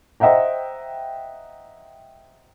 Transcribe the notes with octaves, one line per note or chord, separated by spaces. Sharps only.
C5 D#5 E5 F#5 G5 A#5